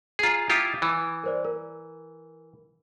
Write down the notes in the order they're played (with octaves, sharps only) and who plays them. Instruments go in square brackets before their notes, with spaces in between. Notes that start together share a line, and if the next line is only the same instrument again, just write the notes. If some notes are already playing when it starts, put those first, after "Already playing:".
[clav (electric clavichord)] F4 G#4 [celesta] G#5 A#5
[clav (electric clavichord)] E4 F4 G4 [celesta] D6 D#6 A6
[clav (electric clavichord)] E3
[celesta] A#4 C5 D5
A#4